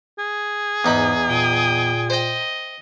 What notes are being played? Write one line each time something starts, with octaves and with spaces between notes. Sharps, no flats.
G#4
E2 G#2 D#4 B5
A#2 G5 D#6
C5 D#5 G5